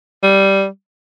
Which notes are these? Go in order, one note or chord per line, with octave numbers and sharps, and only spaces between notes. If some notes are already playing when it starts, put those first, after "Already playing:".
G3